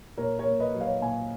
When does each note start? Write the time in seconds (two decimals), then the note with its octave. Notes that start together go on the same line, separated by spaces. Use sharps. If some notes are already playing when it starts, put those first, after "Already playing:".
0.18 A#2 A#4 C#5
0.39 A#4 C#5
0.46 A#3
0.60 B4 D#5
0.74 F#3
0.81 C#5 F5
1.02 A#2 F5 G#5